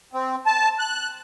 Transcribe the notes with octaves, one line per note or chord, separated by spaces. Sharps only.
C4
A5
F#6